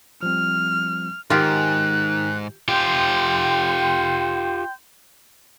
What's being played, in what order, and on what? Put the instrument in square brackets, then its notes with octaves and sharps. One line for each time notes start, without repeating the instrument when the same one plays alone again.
[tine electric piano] F3 G3 C4 [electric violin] F6
[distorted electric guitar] G#2 [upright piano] D#3 [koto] F4 G4 [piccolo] F#6
[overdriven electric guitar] F4 G4 [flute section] G5 C6 G6